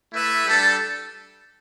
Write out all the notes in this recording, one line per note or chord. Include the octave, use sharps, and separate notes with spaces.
A3 E4 B4 E5
G3 D4 A4